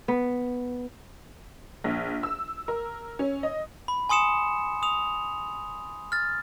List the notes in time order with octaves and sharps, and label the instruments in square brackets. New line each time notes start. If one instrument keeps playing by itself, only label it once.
[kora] B3
[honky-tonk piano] A#1
E6
A#4
C#4
D#5
[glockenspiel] B5
G#5 C6 D#6 C#7 E7
D#6 F7
F6 A6